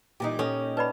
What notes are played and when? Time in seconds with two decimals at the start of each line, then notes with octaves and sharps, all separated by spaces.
0.20 A#2 E3 G3 D#4 G4
0.39 A#2 C#4 A4 D#5 G5
0.77 B4 D5 A5 B5